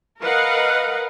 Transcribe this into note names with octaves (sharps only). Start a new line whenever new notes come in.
A#4 B4 D#5 F5 F#5